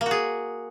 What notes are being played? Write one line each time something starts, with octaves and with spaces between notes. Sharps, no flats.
A#3
F#4
G#4